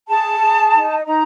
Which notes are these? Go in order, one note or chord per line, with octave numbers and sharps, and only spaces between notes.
G#4 A5
G#4
D#4
D#4 A#5